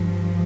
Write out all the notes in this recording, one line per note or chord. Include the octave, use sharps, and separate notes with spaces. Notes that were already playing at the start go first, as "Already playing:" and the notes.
Already playing: G2 F3